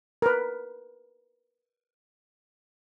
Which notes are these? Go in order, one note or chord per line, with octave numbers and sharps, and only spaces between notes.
A#4 B4